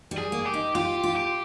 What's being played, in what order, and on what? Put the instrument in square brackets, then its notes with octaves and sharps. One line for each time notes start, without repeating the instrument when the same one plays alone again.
[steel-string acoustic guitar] G3
[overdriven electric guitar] G#4
[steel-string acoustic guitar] A#3
[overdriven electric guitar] G4
[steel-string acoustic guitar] D#4
[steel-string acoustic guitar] F4 [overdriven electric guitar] G4
[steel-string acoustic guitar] F4
[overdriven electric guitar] G4